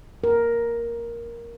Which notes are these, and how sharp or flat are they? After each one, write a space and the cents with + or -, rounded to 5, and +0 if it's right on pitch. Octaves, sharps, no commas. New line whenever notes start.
A#4 +5